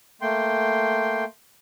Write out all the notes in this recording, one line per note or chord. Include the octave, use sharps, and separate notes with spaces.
A3 A#3 G5 C6